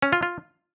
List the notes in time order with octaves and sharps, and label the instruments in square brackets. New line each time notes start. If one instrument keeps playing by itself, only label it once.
[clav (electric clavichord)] C#4
F4
F4